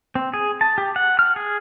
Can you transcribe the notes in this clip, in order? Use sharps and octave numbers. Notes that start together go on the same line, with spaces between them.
C4
G#4
A5
G4
F#5
F6
G#4